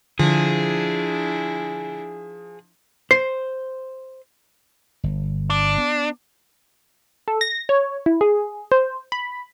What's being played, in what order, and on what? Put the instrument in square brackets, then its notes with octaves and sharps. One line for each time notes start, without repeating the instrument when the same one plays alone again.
[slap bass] D3 [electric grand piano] F3 [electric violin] D4 E4 [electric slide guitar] G#4
[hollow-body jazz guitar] C5 [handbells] C7
[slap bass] G1
[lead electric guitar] D4
[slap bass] B3
[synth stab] A4
A#6
C#5
E4
G#4
C5
B5